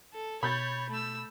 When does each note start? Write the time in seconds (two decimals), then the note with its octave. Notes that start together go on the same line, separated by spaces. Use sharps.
0.14 A4
0.43 B2 C#5 B5 G6 A6
0.90 A3 E6